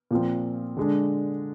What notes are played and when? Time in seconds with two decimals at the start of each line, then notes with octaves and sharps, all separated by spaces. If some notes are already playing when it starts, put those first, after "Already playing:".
0.11 A#2 F3 C4
0.77 D3 G#3 D4